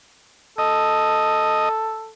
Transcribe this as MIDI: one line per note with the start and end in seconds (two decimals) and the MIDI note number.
0.58 2.12 69
0.58 1.69 75